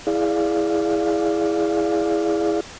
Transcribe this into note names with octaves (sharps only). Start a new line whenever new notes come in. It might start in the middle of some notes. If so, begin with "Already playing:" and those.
E4 G#4 D5 F5